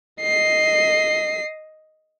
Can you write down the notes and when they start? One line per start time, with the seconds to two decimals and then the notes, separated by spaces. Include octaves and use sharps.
0.21 D#5 C7